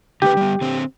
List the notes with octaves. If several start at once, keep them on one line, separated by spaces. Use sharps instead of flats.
D3 A3 G4 B4
G3 B3
D3 C4